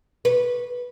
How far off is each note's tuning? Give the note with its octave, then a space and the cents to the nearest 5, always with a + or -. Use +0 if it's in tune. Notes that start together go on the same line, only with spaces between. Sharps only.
B4 -15